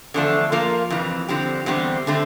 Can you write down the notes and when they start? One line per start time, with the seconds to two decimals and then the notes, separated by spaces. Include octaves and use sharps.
0.14 E2 D3 F3 A3 D4
0.52 F3 A#3 F4 A#4
0.90 F2 C3 E3
1.28 G2 D3 F3 C4 G4
1.66 E2 D3 G3 C4
2.07 D3 A3 C4